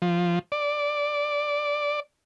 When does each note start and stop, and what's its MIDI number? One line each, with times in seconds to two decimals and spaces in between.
0.02 0.39 53
0.52 2.00 74